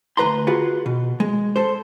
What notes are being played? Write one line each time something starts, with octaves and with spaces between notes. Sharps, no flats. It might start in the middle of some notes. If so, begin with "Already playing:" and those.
D2 C#3 B4 A#5 C6
F4 F#4 G#4 B4 F5
B2
G#3
A4 C5